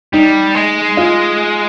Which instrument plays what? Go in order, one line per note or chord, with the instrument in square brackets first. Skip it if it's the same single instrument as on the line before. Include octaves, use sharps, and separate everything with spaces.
[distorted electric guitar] G3 [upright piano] D#4
[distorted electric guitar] G#3
[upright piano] F4